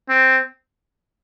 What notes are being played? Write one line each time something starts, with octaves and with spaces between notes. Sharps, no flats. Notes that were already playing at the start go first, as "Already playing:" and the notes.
C4